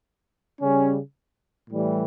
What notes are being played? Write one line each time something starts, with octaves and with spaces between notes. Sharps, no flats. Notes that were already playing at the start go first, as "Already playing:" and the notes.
C#3 G3 C#4
A2 E3 G3